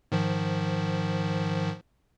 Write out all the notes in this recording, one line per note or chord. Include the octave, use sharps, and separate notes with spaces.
G#2 D#3 F3